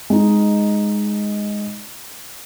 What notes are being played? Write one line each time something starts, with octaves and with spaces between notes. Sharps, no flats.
G#3 D#4